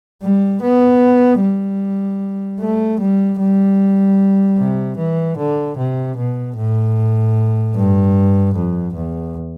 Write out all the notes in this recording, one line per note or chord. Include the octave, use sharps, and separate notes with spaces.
G3
B3
G3
A3
G3
G3
C3
E3
D3
C3
B2
A2
G2
F2
E2